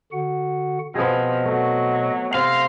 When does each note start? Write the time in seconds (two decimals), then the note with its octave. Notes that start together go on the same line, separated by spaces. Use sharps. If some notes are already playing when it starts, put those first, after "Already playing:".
0.12 D3 F#4 F#5
0.95 B2 F3 B3 C4 G#4 D#5
1.45 F#3 A3
2.34 C3 F5 C6 A#6